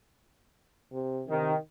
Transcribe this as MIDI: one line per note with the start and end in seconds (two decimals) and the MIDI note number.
0.93 1.23 48
1.29 1.54 48
1.29 1.54 51